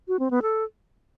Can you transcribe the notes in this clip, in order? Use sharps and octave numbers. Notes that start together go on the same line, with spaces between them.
F#4
C4
B3
A4